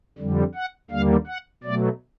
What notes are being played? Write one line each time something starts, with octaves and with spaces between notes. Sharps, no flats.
F2 D3 G3
F#5
D#2 D3 G3 A#3 F5
F#5
B2 F#3 A3 D5